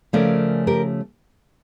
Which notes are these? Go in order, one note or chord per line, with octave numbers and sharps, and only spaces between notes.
C#3 F3 A3 C#4 A#4 D5
G4 A#4